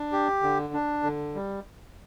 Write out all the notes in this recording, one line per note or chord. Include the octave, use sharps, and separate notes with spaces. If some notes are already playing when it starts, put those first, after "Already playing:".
Already playing: D4
G4
D3
D4
D3
G3